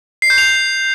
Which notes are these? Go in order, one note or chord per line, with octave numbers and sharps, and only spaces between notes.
C7
G6
F7